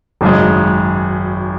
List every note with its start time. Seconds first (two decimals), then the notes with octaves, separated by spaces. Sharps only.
0.21 G#1 F#2 C#3 G#3